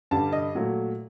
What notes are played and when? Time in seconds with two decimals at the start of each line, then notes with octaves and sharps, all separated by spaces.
0.11 G2 D3 G3 A5
0.32 D#5
0.55 A#2 F#3 A3